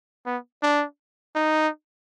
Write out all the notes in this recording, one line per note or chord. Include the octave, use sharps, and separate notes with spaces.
B3
D4
D#4